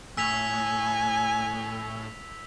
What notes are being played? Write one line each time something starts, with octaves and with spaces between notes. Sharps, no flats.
A2 G#5 E6 B6 F7